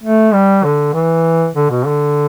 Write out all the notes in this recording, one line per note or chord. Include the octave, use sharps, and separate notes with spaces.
A3
G3
D3
E3
D3
B2
D3